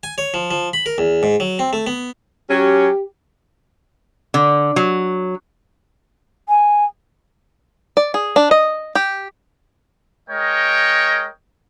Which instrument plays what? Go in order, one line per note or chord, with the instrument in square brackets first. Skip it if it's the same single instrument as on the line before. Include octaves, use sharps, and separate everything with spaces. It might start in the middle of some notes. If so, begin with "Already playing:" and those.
[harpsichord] G#5
C#5
F3
F3
B5
A#4
E2
G#2
F#3
C4
A3
B3
[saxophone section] F#3 C#4 [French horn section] G4
[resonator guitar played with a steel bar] D3
F#3
[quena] G#5
[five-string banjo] D5
G#4
D4
D#5
G4
[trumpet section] G#3 A#4 C#5 D#5 G5